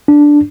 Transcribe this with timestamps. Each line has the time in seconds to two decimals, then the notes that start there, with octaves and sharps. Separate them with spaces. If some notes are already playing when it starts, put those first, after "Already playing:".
0.08 D4